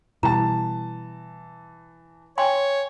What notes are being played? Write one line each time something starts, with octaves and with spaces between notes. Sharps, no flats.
B2 E3 G3 A5 A#5
C#5 G5 G#5 C6